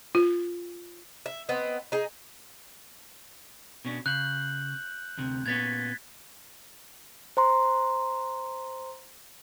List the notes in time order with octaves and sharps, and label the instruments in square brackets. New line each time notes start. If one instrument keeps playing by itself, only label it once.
[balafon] F4
[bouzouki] E5
B3 C4 D#5
D#4 G#4
[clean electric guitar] B2 C#4 D4
[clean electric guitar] C#3 [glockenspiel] F#6 G6 F#7
[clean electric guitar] D2 C3
[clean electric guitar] A#2 B3 C#4 [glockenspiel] G#6 A6 B6
[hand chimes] C5 A#5 C6